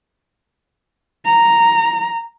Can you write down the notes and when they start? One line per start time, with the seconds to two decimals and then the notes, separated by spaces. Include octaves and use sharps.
1.25 A#5